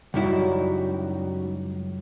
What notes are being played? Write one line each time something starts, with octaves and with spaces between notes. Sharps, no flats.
C#2 F#2 G3 D#4 E4 F#4